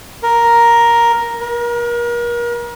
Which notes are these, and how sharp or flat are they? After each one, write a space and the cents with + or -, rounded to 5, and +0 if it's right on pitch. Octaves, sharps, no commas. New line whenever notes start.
A#4 +5
A#4 +35